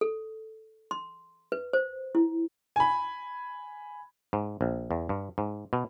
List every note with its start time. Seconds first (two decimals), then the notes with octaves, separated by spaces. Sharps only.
0.01 A4
0.91 C6
1.52 B4
1.73 C5
2.15 E4
2.76 G#5 B5
4.33 G#2
4.61 A#1
4.91 E2
5.09 G2
5.38 G#2
5.73 B2